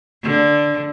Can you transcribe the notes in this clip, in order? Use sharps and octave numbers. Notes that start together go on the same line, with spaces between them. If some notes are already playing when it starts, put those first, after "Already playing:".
D3